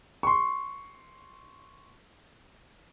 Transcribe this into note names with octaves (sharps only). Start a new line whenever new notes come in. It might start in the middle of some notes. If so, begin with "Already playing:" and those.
C6 C#6